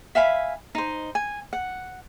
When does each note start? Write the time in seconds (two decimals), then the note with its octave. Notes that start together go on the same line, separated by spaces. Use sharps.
0.15 E5 F5 G#5 B5
0.75 D#4 C5
1.15 G#5
1.53 F#5